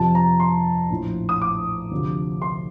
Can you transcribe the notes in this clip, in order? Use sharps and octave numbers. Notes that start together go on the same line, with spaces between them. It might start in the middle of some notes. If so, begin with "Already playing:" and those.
Already playing: F2 C3 F3 A5
A#5
C6
A#1 A2 F3
D#6
D6
D2 C3 F3
C6